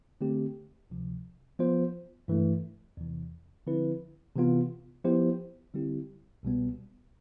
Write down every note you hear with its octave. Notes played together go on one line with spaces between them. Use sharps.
D3 A3 C4 G4
D2 C3 F3
F3 B3 F4 C5
G2 E3 A3
E2 C3 E3
D3 F3 C4 E4 B4
C3 E3 B3 F4
F3 B3 E4 G4 C5
D3 G3 C4 E4 G4
C2 B2 G3 B3